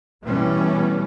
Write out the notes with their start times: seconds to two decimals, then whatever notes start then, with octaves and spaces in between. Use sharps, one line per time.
0.24 B2 E3 G3 A3 B3 C#4